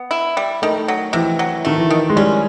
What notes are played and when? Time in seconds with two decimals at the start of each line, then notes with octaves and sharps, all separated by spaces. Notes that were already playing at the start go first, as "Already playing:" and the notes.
Already playing: B3
0.11 E4
0.37 G3
0.62 D#3 A3
0.88 F#3
1.13 C3 E3
1.39 F#3
1.65 D#3 A3
1.78 E3
1.90 D#3
2.09 G#3
2.16 G3 C#4